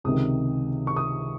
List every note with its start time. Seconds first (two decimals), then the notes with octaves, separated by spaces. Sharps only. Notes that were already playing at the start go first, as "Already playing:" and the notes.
0.04 C#2 C3 D#3 D#6
0.87 C#6
0.96 D#6